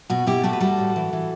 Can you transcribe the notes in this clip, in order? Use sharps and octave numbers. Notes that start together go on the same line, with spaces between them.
B2 F#4
B2 E4 G4
A3 F#4 A4
B4
G3 F#4 A4
A2
E3
E3